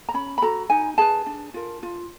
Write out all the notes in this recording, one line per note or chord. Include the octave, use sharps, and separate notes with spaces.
A#5
C#4 B5
B5
F#4 A4 A#5
D#4 G#5
G#4 B4 A5
D4
F4 A#4
F4